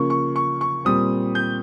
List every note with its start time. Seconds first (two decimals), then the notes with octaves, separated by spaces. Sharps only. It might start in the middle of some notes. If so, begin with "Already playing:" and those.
Already playing: C#3 F3 A#3 C#6
0.10 C#6
0.36 C#6
0.61 C#6
0.85 A#2 G3 C4 D#6
1.35 G6